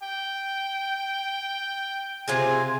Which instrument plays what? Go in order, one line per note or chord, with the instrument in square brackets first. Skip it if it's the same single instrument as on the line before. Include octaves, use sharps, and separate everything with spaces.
[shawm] G5
[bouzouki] C3 F4 G#4 [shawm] G#5